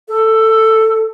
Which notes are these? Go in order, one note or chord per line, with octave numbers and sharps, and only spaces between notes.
A4